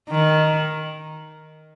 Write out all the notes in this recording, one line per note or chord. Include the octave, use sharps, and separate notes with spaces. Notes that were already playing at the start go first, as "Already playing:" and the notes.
D#3